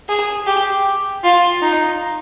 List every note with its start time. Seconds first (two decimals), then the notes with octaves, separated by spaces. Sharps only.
0.09 G#4
0.46 G4
1.24 F4
1.62 D#4